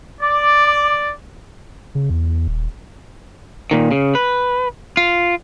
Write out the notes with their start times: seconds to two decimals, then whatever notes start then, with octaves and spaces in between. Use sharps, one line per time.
0.21 D5 D6
1.95 C#3
2.10 E2
2.48 D#1
3.71 A#2 D#3
3.91 C#3
4.15 B4
4.97 F4